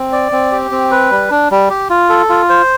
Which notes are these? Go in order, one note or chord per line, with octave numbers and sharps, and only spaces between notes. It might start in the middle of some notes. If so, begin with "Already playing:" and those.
Already playing: C4
D5
C4
G4
C4
B4
G3
D4
G3
G4
F4
A4
F4
C5